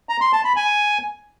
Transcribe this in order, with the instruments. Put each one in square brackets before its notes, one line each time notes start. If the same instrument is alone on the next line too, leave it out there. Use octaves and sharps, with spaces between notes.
[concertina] A#5
C6
A5
B5
G#5